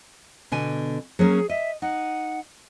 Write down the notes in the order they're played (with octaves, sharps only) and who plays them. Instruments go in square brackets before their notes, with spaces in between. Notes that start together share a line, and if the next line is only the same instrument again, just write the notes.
[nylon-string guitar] B2 D3 G#5
[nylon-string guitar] F#3 A#3 C#4 [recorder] G#4
[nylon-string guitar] D#5 [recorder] E5
[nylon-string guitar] D#4 [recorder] F#5